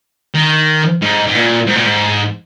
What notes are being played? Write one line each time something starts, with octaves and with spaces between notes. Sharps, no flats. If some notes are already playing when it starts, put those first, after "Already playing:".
D#3
G#2
G#2
A#2
G#2
A#2
G#2